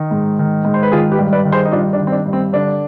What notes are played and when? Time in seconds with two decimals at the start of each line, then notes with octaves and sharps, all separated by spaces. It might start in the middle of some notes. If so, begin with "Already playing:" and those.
Already playing: D#3
0.11 G#2
0.39 D#3
0.65 G#2
0.74 C5
0.83 B4
0.92 D#3 F4 G#4
1.12 G4 B4
1.19 G2
1.33 B4 D5
1.45 D#3
1.52 G#4 C5
1.65 D#4
1.72 G2 D4 F4
1.93 D4
1.99 D#3
2.07 C4
2.12 D4
2.26 G2
2.33 C4
2.53 D3 D4